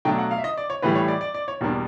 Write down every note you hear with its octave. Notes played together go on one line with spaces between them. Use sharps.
B2 F#3 A3 D4 G5
F#5
F5
E5
D#5
D5
C#5
A2 E3 G3 B4
C#5
D5
D5
D5
C#5
E2 B2 G3 A#3 D4